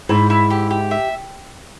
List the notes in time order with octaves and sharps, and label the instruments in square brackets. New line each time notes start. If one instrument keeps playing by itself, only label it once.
[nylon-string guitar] G#2 [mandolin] E4
[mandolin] E4
G4
G4
E5